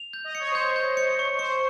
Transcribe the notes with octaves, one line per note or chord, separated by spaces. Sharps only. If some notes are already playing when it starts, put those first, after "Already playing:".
Already playing: F7
G6
D#5
C#5 C#7
C5
G6
C#5
G6
C#7
C#6
C5 C#6